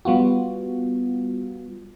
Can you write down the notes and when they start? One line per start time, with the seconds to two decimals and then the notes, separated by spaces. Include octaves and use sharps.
0.05 G3 B3 F4 F#4